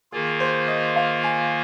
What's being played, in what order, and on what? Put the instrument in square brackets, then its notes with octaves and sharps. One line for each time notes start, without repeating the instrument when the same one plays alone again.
[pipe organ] D#3 A#3 F4 [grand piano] G#4
[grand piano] C5
D#5
F5
G#5